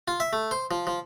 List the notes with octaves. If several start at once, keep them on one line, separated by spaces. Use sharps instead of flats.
F4
E5
A3
C5
F3
F3